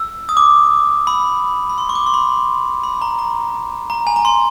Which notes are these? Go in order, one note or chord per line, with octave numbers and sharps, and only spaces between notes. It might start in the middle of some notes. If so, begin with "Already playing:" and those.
Already playing: E6
D#6
D6
B5
B5
C6
C#6
D6
C6
B5
B5
A#5
A#5
A#5
G#5
A#5
C6